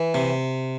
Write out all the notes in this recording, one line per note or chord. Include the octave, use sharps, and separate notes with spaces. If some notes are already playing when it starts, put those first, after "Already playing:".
Already playing: E3
C3